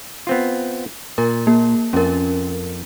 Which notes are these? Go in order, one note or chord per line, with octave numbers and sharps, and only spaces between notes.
B3 C4 F4
A#2 A#4
A#3
F2 C#4 A#4